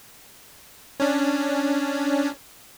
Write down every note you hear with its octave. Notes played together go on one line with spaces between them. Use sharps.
C#4 D4